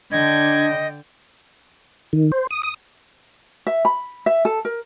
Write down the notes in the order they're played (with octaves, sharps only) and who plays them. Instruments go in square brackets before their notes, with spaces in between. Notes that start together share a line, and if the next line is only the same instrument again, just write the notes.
[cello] D3 G5 [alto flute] D4 [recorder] D#5 [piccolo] G#6
[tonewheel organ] D#3
C5
D#6
D#6
[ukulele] E5
B5
E5
A4
A#4